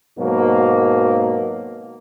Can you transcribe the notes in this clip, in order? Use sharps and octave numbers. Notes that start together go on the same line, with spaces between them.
G#2 B2 F#3 A#3